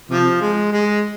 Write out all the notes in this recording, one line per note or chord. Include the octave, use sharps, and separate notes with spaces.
C3 F3
G#3
G#3